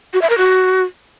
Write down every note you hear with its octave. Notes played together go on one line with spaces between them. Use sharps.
F#4
E5
A#4
F#4